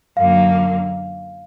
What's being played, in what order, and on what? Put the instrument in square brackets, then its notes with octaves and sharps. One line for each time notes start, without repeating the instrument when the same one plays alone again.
[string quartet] F#2 D3 F#3 A#3 [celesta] F5